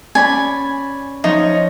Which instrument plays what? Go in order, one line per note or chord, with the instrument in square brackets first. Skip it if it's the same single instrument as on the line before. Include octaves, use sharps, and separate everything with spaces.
[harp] C#4 D5 B5 [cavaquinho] G#5
[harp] F3 C#5 [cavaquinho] D#4